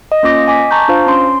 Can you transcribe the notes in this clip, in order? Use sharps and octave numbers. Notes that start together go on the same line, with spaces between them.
D#5
A#3 C#4 F4 D6 A#6
D#5 G#5 D6 B6
A5 A#5 C#6 G6
D4 F4 C5 F5
C#4 C6